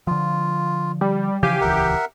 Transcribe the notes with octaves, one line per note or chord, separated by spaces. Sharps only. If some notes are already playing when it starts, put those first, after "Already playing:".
D3 F3 F4
G3
C#3 E3 F3 G4 F5 G#5
D#1 C#2 E3 A#4 E5 F#5